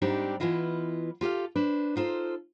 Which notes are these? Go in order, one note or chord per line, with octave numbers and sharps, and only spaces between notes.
G#2 G3 C4 D4 D#4 G4
E3 B3 E4 F4 D#5
F4 G4 A4 F5
D4 B4 C5
D#4 F4 A4 C5